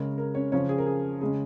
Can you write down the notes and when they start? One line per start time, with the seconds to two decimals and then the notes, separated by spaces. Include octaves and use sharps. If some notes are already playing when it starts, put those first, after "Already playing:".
Already playing: C#3 G#3 C#4 A#4
0.18 A#4
0.35 C#4 C#5
0.52 C#3 F3 C#4 C#5
0.69 G#4
0.78 A#4
0.86 G#4
1.21 C#3 G#3 C#4 G#4